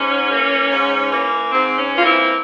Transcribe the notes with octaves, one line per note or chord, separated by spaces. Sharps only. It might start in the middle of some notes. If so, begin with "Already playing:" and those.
Already playing: G#2 C#4
E3 A#3
G#2
E3 A#3
G#2 C4
C#4
E3 A#3 F4
C4 E4